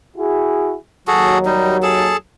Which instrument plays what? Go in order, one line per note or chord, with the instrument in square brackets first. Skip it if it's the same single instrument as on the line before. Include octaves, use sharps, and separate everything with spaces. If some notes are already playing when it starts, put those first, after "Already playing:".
[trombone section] E4 F#4 G#4
[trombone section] D#2 F#3 [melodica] F#4 G#4 A4
[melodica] G3 D#4
G#4 A4 A5